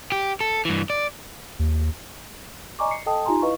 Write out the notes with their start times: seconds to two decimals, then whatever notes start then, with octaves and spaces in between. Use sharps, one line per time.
0.12 G4
0.41 A4
0.65 G2 E3
0.90 D5
1.59 D#2
2.79 D5 D#5 G#5 A#5 C#6 D6
2.91 C7 C#7
3.06 A4 D#5 G5 A5 D#6
3.26 D#4 F4 G4 G#5 A#5 C6
3.42 E4 B4 D#5 F5 C#6